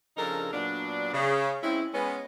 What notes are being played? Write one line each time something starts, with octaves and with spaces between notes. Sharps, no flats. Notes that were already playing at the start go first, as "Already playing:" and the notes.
C#3 F3 D4 D#4 A4 A#4
A#2 F#3 B3 D4
C#3
G#3 C4 C#4 E4
G#3 B3 C#4